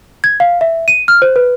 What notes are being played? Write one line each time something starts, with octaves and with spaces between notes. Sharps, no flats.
G#6
F5
E5
D#7
F6
C5
B4